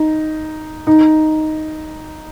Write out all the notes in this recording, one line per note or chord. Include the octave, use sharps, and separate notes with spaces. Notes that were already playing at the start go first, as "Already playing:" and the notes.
Already playing: D#4
D#4